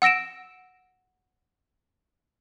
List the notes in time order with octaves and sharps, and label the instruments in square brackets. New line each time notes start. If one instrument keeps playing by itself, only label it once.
[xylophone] F#5 E6 A#6 D7 E7